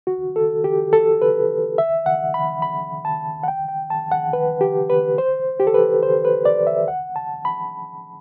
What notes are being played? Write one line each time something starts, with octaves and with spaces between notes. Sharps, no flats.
F#4
A4
G4
A4
B4
E5
F#5
B5
B5
A5
F#5
G5
G5
A5
F#5
B4
G4
B4
C5
G4
A4
B4
C5
B4
D5
E5
F#5
A5
B5